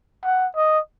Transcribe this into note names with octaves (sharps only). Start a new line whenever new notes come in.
F#5
D#5